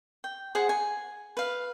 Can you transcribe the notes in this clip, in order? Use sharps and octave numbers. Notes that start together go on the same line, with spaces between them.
G5
G#4 C5 F#5
G#5
B4 F5